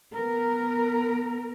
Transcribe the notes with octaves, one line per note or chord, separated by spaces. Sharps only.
B3 A#4